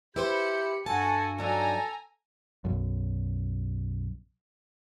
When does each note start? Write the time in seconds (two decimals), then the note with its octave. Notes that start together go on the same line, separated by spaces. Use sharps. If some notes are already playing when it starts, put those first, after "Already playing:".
0.16 E4 G4 B4 C5 B5 G6 C#7
0.86 G2 F#4 A4 G#5 A5
1.38 F#3 D4 D#4 A4 G#5 A#5
2.65 B1 F#2